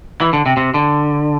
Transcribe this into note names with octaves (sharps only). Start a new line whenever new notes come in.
E3
D3
C3
C3
D3